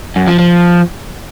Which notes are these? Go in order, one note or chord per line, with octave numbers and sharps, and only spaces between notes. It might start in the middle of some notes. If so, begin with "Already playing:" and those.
F#2
F3
F3